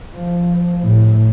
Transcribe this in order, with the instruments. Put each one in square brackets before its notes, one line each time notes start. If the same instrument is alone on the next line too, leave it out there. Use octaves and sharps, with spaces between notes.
[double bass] F3
A2